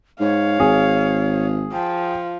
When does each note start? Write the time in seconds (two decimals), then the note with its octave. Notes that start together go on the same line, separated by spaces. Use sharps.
0.20 G#2 C#5 F5
0.60 G#1 G#4
1.72 F3 G5